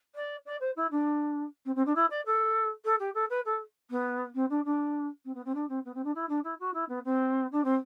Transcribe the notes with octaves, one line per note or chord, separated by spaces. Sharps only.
D5
D5
C5
E4
D4
C4
C4
D4
E4
D5
A4
A4
G4
A4
B4
A4
B3
C4
D4
D4
C4
B3
C4
D4
C4
B3
C4
D4
E4
D4
E4
F#4
E4
B3
C4
D4
C4